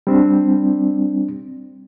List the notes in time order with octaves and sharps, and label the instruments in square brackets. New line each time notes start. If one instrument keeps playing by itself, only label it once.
[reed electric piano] G3 C4 D4